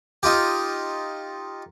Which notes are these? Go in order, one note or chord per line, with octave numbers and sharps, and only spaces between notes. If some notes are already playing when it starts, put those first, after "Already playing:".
D#4 F4 G4